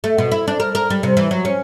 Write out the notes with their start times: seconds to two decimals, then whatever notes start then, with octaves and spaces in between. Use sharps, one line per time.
0.04 A3
0.18 B2
0.32 E4
0.48 D4
0.60 A#4
0.75 A#4
0.90 G3
1.03 C3
1.17 E3
1.31 F#3
1.45 C#4